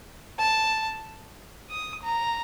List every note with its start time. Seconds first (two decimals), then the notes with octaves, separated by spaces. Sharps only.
0.39 A5
1.70 D#6
2.03 A#5